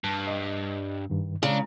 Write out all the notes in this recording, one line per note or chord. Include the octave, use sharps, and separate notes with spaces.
G2 A5
D#5
G2 D#3
C#3 G#3 D4 A#5